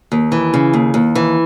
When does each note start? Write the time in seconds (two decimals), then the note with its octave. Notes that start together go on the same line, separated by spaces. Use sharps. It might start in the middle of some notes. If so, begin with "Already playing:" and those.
0.12 D#2
0.32 E3
0.54 C#3
0.74 D#2
0.94 D#2
1.15 E3